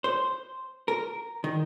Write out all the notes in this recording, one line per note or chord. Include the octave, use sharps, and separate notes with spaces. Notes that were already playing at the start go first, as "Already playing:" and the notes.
C5
A#4
D#3